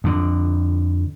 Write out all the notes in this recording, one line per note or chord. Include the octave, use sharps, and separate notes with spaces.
F2 D3